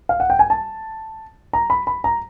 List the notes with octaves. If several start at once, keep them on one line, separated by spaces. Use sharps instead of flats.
F5
F#5
G5
G#5
A5
A#5
B5
B5
A#5